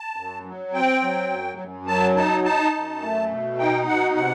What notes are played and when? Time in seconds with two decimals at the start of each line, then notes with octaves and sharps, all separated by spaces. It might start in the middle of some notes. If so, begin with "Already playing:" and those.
Already playing: A5
0.16 F#2
0.45 F#3
0.73 C4 G5
1.02 F#3
1.30 F#2
1.59 F#2
1.87 F#3 A5
2.16 D#4 A5
2.44 D#4 A5
2.74 F#2
3.02 A3
3.31 B2
3.59 D#4 G5
3.88 B2 F#5
4.16 C3 F#5